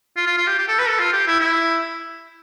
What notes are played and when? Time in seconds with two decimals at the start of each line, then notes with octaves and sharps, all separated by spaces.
0.16 F4
0.27 F4
0.37 F4
0.47 G4
0.58 G4
0.68 A4
0.79 B4
0.88 A4
0.99 F4
1.13 G4
1.27 E4
1.40 E4